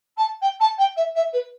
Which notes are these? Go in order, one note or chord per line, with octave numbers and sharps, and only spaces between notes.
A5
G5
A5
G5
E5
E5
B4